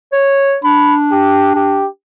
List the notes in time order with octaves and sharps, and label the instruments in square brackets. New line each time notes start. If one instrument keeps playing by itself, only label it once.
[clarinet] C#5
[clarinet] D4 [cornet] B5
[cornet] G4
G4